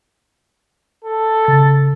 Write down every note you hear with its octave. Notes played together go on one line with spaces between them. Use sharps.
A4
C#3 A6